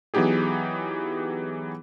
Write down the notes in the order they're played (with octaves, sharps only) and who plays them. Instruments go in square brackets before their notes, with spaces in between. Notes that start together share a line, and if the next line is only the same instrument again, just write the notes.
[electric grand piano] E3 F#3 B3 D#4 G4 G#4